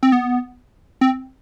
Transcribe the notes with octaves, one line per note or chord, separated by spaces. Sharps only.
C4
B3
C4